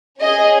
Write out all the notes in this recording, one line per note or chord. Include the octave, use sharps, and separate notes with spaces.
C#4 G#4 D#5